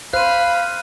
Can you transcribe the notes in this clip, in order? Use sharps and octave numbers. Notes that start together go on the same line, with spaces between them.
C5 F5 B5 F#6 D#7